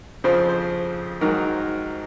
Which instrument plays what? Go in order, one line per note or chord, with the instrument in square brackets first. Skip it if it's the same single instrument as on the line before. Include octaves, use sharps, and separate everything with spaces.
[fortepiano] F2 C#3 F3 C5
C5
G#2 D#3 F#3 A#4